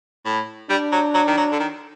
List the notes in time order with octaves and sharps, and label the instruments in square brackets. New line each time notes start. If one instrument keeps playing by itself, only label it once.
[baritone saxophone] A2
[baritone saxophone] G3 [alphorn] D4
[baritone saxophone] F#3
F#3
D#3
F#3
D3
D#3